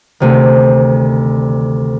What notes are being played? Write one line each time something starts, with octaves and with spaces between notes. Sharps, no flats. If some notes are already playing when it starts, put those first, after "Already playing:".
D2 C3 D#3